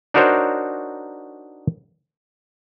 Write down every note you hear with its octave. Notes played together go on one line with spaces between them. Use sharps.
D4 D#4 F#4 A#4 C5 C#5